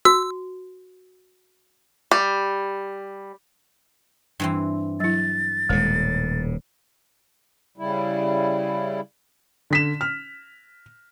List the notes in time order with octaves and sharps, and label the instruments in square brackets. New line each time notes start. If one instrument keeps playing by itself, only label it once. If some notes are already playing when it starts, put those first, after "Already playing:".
[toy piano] F#4 [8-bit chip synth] E6
[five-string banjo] G3
[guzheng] G2 E3 C4
[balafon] F#3 E4 [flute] A6
[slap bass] D#1 A2 [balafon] G#3
[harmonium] C#3 G3 E4
[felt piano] D3 B6 E7
F6